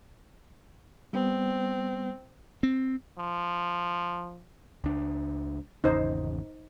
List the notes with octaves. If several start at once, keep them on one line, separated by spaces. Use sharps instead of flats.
G3 B3 C4
C4
F3
C#2 D4
G#1 E2 C#3 D#4 C5